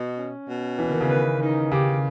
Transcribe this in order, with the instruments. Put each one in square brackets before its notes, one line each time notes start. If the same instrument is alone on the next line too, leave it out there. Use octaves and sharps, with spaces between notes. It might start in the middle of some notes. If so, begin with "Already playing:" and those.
Already playing: [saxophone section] B2
C#4
B2
[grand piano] E3 [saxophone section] A#3
[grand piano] D#3
C#3
[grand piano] D#3 [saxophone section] B4
[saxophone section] D#4
[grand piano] C#3 [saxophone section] G4